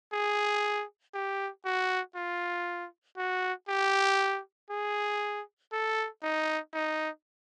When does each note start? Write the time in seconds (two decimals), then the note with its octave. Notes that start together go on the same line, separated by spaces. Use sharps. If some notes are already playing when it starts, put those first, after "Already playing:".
0.13 G#4
1.14 G4
1.65 F#4
2.15 F4
3.17 F#4
3.69 G4
4.70 G#4
5.72 A4
6.23 D#4
6.74 D#4